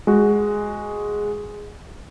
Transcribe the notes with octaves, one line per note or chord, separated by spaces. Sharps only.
G#3 F#4